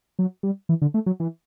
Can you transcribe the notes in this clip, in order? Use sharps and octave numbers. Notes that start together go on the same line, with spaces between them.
F#3
G3
E3
D3
A3
F#3
E3